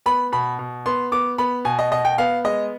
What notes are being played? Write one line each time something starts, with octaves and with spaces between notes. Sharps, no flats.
B3 B5
B2 B5
B2
B3 C6
B3 D6
B3 B5
B2 G#5
D#5
B2 D#5
G5
B3 F5
G#3 D#5